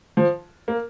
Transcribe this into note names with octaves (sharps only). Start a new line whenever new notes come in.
F3
A#3